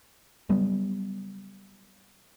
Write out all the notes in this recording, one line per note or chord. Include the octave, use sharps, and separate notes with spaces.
C#3 F#3 G3 B3